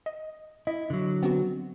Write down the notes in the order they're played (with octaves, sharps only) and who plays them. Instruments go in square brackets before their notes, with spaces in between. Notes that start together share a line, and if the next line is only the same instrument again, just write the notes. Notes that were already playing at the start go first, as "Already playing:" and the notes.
[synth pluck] D#5
[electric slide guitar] E4 [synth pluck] D#5
[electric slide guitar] D3 F#3
[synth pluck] B3 C4 F#4